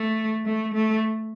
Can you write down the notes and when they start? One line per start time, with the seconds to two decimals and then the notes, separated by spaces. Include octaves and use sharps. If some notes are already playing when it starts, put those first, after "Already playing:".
Already playing: A3
0.45 A3
0.74 A3